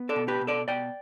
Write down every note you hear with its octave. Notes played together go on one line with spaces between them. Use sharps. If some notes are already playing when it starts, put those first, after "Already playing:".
Already playing: B3
A4 D5
B2
G4 B4
B2
A4 D5
B2 D5 G5